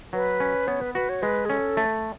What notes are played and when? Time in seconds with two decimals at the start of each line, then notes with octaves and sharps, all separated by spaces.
0.13 F#3 B4
0.40 C#4
0.68 B3 C#5
0.81 B4
0.94 F#4 B4
1.09 C#5
1.22 G#3 B4
1.45 G#4
1.50 C#4 A4
1.77 A3